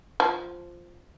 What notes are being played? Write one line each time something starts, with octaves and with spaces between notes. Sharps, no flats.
F3